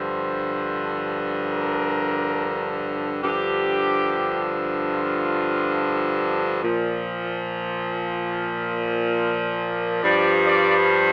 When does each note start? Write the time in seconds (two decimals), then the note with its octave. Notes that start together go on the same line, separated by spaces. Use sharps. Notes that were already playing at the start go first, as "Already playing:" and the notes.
Already playing: G2 D3 F3 C5
1.51 A#4
3.21 G2 D3 F3 G4
4.92 F4
6.62 A#2 F3
10.02 G2 F3 D5
10.45 D5